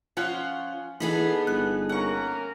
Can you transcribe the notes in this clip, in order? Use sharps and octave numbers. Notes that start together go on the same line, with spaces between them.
F3 C#4 F4 C5 C#5 F#5
E3 B3 D4 D#4 G#4 A4 B4 B5
G1 F#6
A#3 C#4 A#4 F#5 C#6